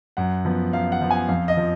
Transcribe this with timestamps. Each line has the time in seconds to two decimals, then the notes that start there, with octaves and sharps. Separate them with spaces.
0.17 F#2 F#5
0.45 F3 B3
0.72 F#2 F5
0.92 F#5
1.02 F3 B3
1.11 G#5
1.29 F2 F5
1.48 D#5
1.57 F3